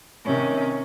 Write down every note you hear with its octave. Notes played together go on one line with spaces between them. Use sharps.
C3 D#3 C#4